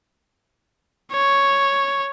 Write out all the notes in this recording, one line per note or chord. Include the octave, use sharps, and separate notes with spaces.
C#5